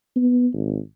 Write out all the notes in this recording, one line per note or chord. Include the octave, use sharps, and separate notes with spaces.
B3
G#1